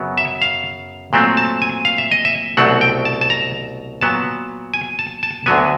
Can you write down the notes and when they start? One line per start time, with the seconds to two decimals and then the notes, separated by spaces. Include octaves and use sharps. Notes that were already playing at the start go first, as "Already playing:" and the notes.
Already playing: F#2 C#3 F#3 B3
0.17 E5
0.42 F5
1.13 A#2 F#3 A3 C4
1.37 A5
1.62 G#5
1.85 F5
1.98 E5
2.11 D#5
2.25 E5
2.57 C2 B2 F#3 A3 C4 F#5
2.81 G5
3.05 A5
3.21 A5
3.30 A#5
4.01 A#2 F#3 B3 A5
4.74 G#5
4.99 A5
5.23 A5
5.46 D2 D3 F#3 B3 G#5